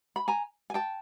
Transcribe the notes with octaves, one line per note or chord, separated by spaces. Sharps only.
B5
G#5 A#5
G#5
G5 A5